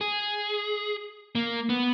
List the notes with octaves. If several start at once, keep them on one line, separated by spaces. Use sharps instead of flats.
G#4
A#3
B3